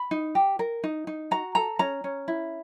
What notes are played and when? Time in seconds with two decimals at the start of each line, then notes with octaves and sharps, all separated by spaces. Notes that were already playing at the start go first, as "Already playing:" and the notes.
Already playing: B5
0.11 D#4
0.35 G4
0.59 A#4
0.84 D#4
1.07 D#4
1.31 F#4 A#5
1.55 A4 A#5
1.79 C#4 A#5
2.04 C#4
2.28 E4